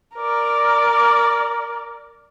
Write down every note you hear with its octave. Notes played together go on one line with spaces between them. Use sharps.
A#4 D5